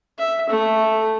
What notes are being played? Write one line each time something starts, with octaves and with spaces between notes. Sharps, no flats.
E5
A3